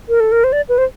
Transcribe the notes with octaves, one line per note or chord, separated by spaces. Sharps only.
A#4
A4
A#4
C5
D5
B4
C5